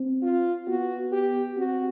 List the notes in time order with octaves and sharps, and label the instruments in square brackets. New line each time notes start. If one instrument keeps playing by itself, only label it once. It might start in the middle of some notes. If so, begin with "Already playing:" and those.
Already playing: [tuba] C4
[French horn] F4
[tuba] B3 [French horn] F#4
[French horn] G4
[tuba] C4 [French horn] F#4